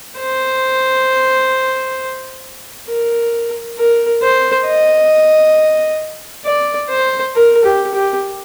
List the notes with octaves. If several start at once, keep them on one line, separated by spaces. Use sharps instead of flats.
C5
A#4
A#4
C5
D#5
D5
C5
A#4
G4
G4